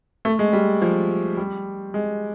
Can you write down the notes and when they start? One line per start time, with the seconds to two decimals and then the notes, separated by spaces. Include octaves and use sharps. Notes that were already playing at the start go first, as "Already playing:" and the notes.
0.25 A3
0.39 G#3
0.53 G3
0.82 F3
1.37 G3
1.94 G#3